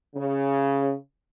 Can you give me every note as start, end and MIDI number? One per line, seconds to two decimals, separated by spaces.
0.15 0.92 49